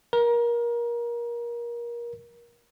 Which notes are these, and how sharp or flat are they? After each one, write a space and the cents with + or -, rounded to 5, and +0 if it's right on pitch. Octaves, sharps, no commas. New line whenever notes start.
A#4 +25